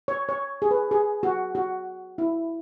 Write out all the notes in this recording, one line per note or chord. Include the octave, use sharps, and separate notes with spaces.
C#5
C#5
G#4
B4
G#4
F#4
F#4
E4